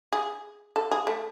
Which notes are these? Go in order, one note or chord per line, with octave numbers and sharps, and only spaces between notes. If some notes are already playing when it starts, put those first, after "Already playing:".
G#4
A4
G#4
A3